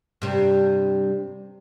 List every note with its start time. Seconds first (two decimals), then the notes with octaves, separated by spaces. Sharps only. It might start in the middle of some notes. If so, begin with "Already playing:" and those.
0.22 G2 C3